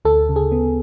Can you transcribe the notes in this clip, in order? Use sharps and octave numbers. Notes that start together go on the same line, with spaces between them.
D2 A4
C#3
G#4
B3